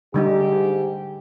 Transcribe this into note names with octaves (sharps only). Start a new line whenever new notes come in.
G#2 D3 G3 D#4 G4